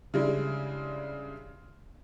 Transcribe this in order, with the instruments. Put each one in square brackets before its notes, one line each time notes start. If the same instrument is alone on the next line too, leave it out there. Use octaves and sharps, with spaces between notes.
[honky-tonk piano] C#3 G3 G#3 D4 E4